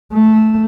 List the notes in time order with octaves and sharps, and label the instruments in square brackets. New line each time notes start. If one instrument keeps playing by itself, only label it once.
[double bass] A3